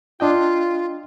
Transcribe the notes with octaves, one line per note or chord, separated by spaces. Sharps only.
D4 F4 D#5 G5